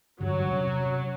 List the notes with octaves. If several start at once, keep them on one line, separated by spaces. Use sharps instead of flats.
E2 G2 D3 F#3
C3 C#4